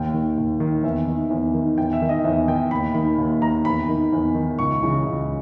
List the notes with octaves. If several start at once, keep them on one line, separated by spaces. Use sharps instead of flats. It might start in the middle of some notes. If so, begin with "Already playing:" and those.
Already playing: D#2 G5
D#3
D#2
D#3
E2 E5
D#3
E2
D#3
E2 G5
E5
D#3
D#5
E2 E5
D#3 G5
D#2 B5
D#3 B5
D#2
D#3 A#5
E2 B5
D#3
E2
D#3
C#2 C#6
C#3 E3
C#2